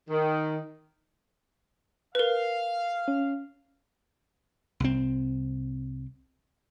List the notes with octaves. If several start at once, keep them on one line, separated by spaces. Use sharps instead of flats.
D#3
A#4 B4 F5
C#4
C2 C4